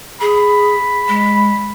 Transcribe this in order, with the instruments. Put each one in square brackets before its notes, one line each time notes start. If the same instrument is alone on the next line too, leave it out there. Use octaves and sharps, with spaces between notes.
[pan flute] G#4 [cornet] B5
[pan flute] G#3